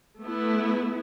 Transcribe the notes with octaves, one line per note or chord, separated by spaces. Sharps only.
A3 B3 E4